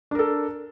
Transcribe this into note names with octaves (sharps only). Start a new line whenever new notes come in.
D4 A4 A#4